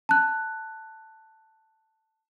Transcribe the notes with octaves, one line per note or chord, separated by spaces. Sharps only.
A5 F#6